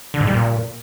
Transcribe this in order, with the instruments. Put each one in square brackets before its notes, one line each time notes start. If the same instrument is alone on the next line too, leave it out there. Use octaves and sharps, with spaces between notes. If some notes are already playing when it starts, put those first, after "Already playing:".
[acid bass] D3
G#2
G3
A#2